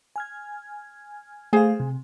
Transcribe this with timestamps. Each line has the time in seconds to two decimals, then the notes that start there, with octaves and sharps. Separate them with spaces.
0.16 G#5 F6 G#6
1.53 A3 G#4 C5 F5 G#5
1.80 C3